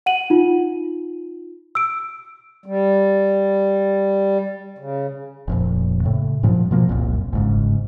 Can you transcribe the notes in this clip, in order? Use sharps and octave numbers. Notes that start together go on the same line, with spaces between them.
F#5 D#7 F#7
D#4 F4
E6 D7
G3
C#3
F1 F2 A#2
A2 C#3
G2 A#2 F3 F#3
B2 F3 A#3
F1 C2 F#2 A#2
G1 G#2 C#3